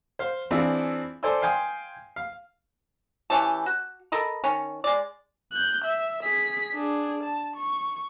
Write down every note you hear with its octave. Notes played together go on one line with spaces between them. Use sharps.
C5 F5
E3 C4 D4 E4 F4 G#4
A4 C5 D5 G#5 C6 E6
F5 G5 G#5 C6 D#6
F5
E3 C#4 G4 A5
F#4
A4 A#4 D#5 B5
D#3 C#4
G#3 D5
F#6 G6
E5
G#4 B6
D4 G#4
A5
C#6